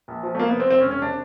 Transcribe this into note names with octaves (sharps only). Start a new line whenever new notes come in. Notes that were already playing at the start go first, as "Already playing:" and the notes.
A#1
F3
A3
F3 A#3
B3
C3 C4
E1 C4
C#4
E1
C#4
C3 D4